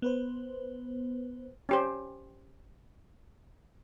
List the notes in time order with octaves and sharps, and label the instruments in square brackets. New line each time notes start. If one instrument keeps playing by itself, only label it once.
[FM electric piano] B3 B4 C5
[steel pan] C#4 G4 C5